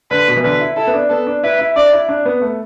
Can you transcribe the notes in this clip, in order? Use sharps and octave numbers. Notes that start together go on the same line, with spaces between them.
D3 B4
B2
E3
D3 B4
E4
E4 A4
B3
D4
B3 A4
D4
E4 B4
E4
D4 D5
E4
D4
B3
A3